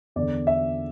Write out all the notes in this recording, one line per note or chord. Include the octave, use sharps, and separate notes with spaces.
E2 D3 D5
E5